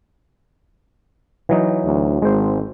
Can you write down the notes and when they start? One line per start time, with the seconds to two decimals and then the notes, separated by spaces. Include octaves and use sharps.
1.49 E3 F#3 D#4
1.85 D2
2.22 G#1 G#3 C5